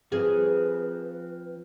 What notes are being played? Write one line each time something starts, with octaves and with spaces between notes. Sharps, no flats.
F3 C4 G#4 B4